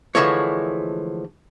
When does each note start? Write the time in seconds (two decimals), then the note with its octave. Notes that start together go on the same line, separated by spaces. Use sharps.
0.15 D3 E3 F3 G#3 A3 C#5